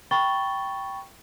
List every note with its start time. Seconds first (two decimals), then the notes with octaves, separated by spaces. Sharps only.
0.11 G5 B5 C#6 A6 G7